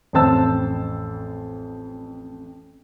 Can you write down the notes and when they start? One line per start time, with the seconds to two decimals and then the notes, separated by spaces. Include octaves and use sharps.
0.13 A1 F2 C5 A5 E6